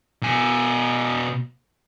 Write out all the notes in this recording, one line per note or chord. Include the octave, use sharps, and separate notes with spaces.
B2 G#5